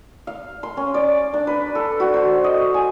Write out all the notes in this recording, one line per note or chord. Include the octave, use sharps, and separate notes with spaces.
F5
C6
C#4
D5
D4
B4
A4
F#4
C5
D#5
G#5